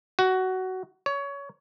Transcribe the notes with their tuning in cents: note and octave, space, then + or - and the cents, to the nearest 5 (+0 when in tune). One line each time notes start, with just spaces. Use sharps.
F#4 +15
C#5 +20